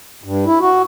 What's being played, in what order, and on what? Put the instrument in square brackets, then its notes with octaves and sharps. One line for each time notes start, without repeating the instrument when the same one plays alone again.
[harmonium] G2
E4
F#4